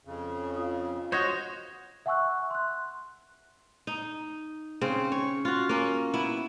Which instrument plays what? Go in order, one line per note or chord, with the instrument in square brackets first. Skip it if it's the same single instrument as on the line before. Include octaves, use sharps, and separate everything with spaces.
[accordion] F2 C#3
[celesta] F4 F5 D#6
[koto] F#4 C#5 [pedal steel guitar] C5 D#5
[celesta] E5 F#5 G#5 C#6 E6 F#6
C6 F#6
[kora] D#4
C#3 C4
C#5
F4 F#4
A#3 C#4
B3 E4